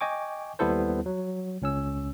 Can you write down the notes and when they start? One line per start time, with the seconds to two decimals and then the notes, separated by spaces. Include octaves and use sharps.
0.01 D#5 G5 G#5 C#6 D6
0.59 D#2 G3 B3 E4 A4 C5
1.06 F#3
1.62 C#2 C#4 E6